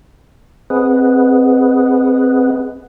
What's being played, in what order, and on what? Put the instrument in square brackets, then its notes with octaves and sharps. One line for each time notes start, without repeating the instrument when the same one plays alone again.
[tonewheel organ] C4 G#4 B4 D#5 F#5